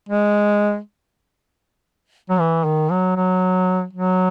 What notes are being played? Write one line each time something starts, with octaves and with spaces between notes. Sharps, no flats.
G#3
F#3
E3
D#3
F#3
F#3
F#3